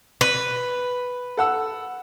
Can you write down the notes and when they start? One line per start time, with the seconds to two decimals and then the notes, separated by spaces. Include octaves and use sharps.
0.21 B4
1.37 A4 F#5 E6